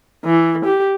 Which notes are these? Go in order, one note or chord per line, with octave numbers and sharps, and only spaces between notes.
E3
G4